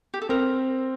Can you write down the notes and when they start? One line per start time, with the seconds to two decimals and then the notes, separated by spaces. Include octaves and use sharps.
0.14 G4
0.22 A4
0.29 C4 A#4